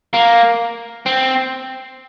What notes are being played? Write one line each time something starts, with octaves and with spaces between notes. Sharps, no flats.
A#3
C4